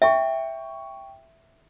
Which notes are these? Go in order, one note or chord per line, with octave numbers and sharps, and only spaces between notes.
E5 G5 C#6